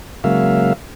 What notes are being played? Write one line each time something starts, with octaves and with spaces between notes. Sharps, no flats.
C#3 F#3 G#3 A#3 E5 F5